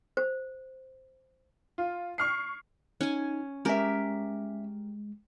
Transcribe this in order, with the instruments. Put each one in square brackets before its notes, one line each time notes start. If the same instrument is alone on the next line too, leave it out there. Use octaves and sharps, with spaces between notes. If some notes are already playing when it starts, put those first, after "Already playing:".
[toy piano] C5
[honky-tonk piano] F4
C#6 F6 C7
[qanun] C#4 G#5 [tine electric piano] D#4
[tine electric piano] G#3 [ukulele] C#4 E5 [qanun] G4 A#4